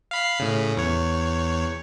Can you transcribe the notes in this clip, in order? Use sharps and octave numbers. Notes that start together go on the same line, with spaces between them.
F5 B5 C7
A2 C#3
E2 C#5